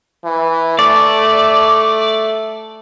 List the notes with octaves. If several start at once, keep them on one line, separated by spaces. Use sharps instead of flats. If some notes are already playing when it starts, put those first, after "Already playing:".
E3
A3 D5